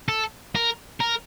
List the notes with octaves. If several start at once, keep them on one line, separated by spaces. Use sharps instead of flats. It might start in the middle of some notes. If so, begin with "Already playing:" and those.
A4
A#4
A#4